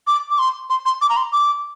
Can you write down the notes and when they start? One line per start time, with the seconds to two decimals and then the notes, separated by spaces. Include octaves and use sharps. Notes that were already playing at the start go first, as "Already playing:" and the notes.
0.07 D6
0.31 D6
0.39 C6
0.70 C6
0.86 C6
1.02 D6
1.10 A#5
1.17 C6
1.33 D6